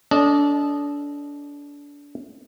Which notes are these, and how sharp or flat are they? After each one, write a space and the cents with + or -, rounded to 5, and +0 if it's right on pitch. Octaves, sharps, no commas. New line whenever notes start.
D4 -30 A4 -5 D#5 -10